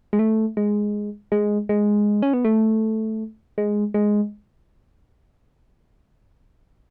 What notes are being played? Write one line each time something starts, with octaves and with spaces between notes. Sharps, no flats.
G#3
A3
G#3
G#3
G#3
C#4
B3
A3
G#3
G#3